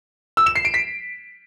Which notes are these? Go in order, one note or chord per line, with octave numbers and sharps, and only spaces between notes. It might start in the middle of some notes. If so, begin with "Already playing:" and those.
E6
E7
C7
D7
B6